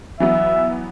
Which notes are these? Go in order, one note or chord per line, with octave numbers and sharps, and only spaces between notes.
E3 F#3 B3 E5